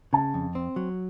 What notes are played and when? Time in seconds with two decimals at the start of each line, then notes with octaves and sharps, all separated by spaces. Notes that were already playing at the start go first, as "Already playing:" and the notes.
0.13 C#3 A5
0.34 F2
0.55 C4
0.76 F#3